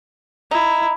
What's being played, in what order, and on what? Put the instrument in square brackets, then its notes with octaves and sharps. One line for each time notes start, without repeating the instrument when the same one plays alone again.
[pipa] D#4 [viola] E4